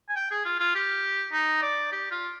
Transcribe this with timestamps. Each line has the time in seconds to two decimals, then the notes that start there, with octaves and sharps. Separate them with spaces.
0.09 G#5
0.16 G5
0.31 G#4
0.45 F4
0.60 F4
0.75 G4
1.33 D#4
1.62 D5
1.92 G4
2.11 F4